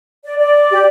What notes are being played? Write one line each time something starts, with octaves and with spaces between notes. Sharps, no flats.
D5
D5
G4